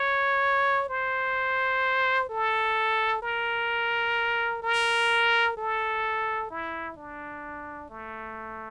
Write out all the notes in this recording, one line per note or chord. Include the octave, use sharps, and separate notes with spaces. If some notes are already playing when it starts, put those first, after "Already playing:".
Already playing: C#5
C5
A4
A#4
A#4
A4
E4
D4
A3